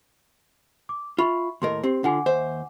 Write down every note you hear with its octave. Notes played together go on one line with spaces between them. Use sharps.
D6
F4 E5 B5 C#6
D#2 A2 A#4 D#5 C6
C4 G4
D3 F4 F#5 G#5 D6
D#2 C5 E5